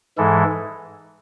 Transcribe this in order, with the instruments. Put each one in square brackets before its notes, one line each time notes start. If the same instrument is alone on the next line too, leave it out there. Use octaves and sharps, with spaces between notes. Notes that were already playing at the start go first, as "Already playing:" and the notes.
[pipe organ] G#2 E3 G#3 A4